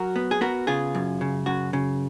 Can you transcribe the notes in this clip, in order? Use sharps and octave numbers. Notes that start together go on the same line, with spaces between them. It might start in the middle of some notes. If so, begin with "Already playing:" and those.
Already playing: F#3 F#4 A#4
B3
G#4
B3 F#4 A#4
C#3 F4 G#4
F#2
C#3
F#2 F#4
C#3